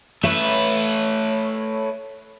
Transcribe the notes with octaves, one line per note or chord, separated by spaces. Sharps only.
A3 B4 C#5 E5